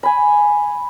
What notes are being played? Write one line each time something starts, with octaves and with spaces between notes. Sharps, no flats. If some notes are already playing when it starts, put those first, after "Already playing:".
G#5 B5